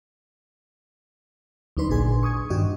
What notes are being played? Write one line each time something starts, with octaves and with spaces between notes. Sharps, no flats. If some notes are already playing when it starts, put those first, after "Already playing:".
D2 F#3 D4 D#4 B4 C6
A1 A#2 D4 G#4 G#5 C6
C#6 D#6 G#6
G2 D#3 D4 F#4 G4 D#5